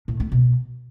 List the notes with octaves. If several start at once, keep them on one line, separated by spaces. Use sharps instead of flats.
A2
A3
B2